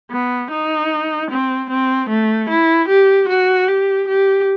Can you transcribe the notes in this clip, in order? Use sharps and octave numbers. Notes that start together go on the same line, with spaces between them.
B3
D#4
C4
C4
A3
E4
G4
F#4
G4
G4